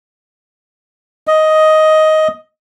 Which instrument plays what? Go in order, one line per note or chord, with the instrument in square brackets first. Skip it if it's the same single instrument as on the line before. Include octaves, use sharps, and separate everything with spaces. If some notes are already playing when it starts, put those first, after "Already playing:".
[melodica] D#5